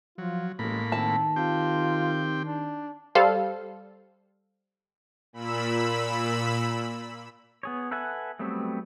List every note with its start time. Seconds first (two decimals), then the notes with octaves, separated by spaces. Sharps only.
0.18 F3 F#3 F4
0.59 A1 A2 G#3 A#3 B5
0.92 D#3 C4 A5
1.36 C4 F4 G4 G5
2.46 D4
3.15 G3 A4 C5 F5
5.33 A#2 B5 E6
7.63 B3 G#4 C#5
7.91 A4 B4 E5 F#5 G#5
8.39 F#3 G3 A3 B3 C4